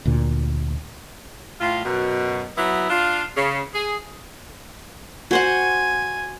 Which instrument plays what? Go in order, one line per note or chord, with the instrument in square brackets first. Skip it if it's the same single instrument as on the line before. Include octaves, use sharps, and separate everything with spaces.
[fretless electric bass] D2 A#2
[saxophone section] A2 F4
F#2 B2
F#3 B3 E4
D4 F4
C#3
G#4
[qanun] F#4 C5 F#5 [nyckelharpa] G#5